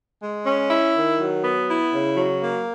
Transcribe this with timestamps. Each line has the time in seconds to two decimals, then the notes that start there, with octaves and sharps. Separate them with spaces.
0.22 G#3
0.46 C#4
0.70 E4
0.95 D#3
1.19 F#3
1.43 B3
1.68 E4
1.91 C#3
2.16 F#3
2.41 A#3